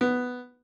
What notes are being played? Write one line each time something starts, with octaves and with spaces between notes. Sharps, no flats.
B3